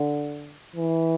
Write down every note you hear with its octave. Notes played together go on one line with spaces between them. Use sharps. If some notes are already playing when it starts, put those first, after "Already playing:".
Already playing: D3
E3